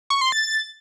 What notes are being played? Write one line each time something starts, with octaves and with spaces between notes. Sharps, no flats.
C#6
C6
A6